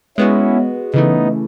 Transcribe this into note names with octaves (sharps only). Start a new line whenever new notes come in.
G#3 B3 C#4 E4 F#4
C#3 E3 A3 B3 D#4